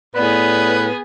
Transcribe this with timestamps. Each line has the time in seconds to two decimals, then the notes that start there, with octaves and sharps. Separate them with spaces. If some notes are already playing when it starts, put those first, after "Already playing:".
0.15 A2 B3 G#4 B4 D5